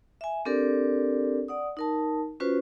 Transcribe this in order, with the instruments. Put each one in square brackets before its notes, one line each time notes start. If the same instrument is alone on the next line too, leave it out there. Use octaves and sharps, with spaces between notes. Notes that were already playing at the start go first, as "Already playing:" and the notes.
[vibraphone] E5 G#5
C4 D4 G4 A4 A#4 D5
D5 F#5 D#6
D#4 A#4 A5
C#4 F4 F#4 B4 C5